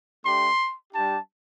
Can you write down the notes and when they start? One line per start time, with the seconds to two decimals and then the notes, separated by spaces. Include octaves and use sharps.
0.25 A3 D4 G4 C6
0.93 G3 D4 G4 A5